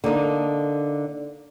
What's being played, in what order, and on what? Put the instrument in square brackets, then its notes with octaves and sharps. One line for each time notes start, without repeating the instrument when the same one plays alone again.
[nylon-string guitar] D3 A#3 D#4 A4